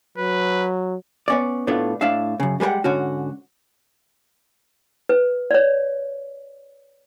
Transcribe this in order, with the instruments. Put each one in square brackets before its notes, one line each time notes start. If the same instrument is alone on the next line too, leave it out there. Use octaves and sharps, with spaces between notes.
[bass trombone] F#3 [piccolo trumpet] B4
[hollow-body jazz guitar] B3 C#4 D5
A2 A3 B3 D4 F4
A2 D4 E5 F5
F#2 C#3
G3 G#3 B4 F#5 G5
G#2 D3 C#4 F#4
[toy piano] B4
C#5 D5